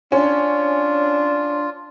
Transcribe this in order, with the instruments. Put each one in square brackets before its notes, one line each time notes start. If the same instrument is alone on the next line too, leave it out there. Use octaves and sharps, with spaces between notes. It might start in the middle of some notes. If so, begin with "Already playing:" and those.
[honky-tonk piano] C#4 [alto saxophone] D4 [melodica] F4